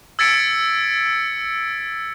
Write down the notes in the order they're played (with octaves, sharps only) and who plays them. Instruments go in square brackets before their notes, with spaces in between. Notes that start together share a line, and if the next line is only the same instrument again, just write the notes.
[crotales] E6 G#6 A6 B6 C#7 D7